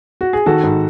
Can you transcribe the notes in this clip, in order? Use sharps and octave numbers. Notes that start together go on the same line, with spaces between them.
F#4
G#4
D#3 F#4 A4
G#2